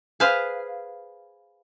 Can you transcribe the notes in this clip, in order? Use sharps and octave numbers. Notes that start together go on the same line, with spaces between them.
G#4 B4 C5 F5